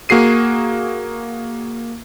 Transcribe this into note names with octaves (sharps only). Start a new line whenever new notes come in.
A#3 F#4 G#4 C7 D#7